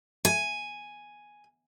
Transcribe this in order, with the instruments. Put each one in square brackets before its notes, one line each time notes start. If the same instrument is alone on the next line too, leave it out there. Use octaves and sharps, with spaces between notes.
[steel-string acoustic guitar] G#5